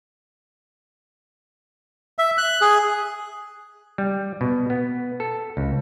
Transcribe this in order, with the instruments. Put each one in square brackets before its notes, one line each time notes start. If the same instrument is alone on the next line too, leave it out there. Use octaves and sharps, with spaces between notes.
[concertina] E5
F#6
G#4
[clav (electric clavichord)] G3
B2
B3
A4
C#2